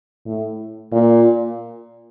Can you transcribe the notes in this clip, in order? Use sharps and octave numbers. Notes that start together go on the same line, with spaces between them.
A2
A#2